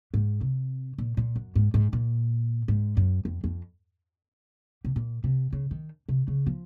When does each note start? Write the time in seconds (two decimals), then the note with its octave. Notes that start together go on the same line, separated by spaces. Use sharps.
0.14 G#2
0.41 C3
0.98 A#2
1.17 A#2
1.36 F#2
1.55 G#2
1.74 G#2
1.93 A#2
2.68 G#2
2.97 F#2
3.25 F2
3.44 F2
4.85 C3
4.96 A#2
5.24 C3
5.53 C#3
5.71 D#3
6.09 C3
6.28 C#3
6.46 F3